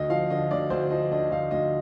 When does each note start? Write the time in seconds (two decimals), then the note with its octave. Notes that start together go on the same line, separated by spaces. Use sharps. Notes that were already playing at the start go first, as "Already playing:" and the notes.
Already playing: D2 D#5
0.10 F3 F5
0.30 D3 D#5
0.51 D2 D5
0.70 D2 C5
0.90 F3 D#5
1.11 D3 D#5
1.31 D2 F5
1.51 D2 D#5